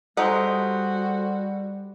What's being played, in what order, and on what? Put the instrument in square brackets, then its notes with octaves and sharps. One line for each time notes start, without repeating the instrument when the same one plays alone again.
[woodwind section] G3 [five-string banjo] G#3 D#4 F#5 [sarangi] F#4 [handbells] A4 C5 C6